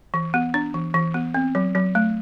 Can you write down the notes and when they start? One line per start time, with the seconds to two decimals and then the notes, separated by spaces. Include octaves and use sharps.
0.14 E3
0.34 B3
0.54 D4
0.74 E3
0.94 E3
1.14 B3
1.34 C4
1.55 F#3
1.75 F#3
1.95 A3